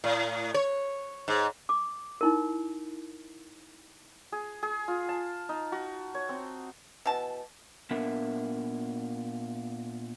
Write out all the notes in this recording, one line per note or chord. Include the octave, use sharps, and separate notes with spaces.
A2
C#5
G#2
D6
D#4 E4 A#4
G#4
G#4
F4
A5
D#4
F#4
C#5
C4
B2 E3 A5
A#2 B3 D4 A#4 E5